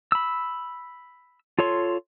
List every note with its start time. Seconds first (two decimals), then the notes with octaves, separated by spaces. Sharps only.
0.12 B5 E6
1.59 F4 A4 C#5 C6